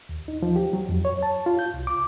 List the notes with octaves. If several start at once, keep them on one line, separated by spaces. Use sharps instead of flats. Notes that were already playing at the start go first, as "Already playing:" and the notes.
D#2
D#4
F3
G4
F#3
F2
C#5
A5
F4
G6
C2
D6